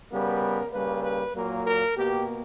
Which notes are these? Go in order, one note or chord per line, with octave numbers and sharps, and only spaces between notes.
C#3 G3 B3 A#4
C#3 G3 A#3 B4
B4
A#2 F#3 A#3 A#4
A#4
B2 A#3 G4